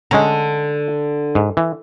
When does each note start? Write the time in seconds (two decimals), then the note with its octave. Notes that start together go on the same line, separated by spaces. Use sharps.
0.11 D3 G#3 C#4 A#5
1.35 G#2
1.57 E3